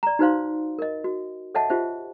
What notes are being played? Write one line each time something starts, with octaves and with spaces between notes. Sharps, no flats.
D5 A#5
D#4 F#4 B4 C5 F5 C6
A#4 D#5
F#4
A4 C#5 D#5 E5 F#5 A5
F4 G4 C5 E5